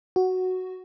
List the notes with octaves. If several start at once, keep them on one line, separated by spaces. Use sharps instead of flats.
F#4